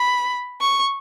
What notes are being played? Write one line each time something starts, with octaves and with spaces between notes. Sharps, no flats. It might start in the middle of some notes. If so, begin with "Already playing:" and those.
Already playing: B5
C#6